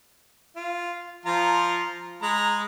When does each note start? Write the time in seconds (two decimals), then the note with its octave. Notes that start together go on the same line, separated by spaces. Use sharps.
0.56 F4
1.26 F3 F4 A#5
2.22 G#3 A#5 B5